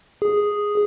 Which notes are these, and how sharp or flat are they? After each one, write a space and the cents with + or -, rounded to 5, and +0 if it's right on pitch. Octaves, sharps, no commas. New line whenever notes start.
G#4 -5